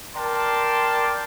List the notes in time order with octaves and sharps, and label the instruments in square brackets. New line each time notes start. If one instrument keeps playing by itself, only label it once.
[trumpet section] A#4 D5 G5 A5 C6